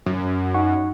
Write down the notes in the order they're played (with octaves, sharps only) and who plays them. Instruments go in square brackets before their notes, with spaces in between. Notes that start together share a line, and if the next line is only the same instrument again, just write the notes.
[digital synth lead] F#2
[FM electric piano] D#4 F#5 C#6